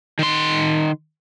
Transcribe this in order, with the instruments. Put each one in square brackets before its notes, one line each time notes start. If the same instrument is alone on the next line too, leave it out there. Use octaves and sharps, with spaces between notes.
[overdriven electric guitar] D#3 C6